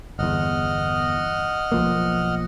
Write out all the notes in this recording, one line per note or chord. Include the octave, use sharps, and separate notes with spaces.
G1 E2 D#5 F#5 F6
B1 F3 A#3